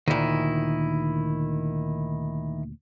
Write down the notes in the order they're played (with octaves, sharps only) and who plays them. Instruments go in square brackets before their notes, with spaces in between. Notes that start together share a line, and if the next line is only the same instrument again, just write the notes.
[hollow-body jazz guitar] D2 A#2 [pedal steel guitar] D#3 E4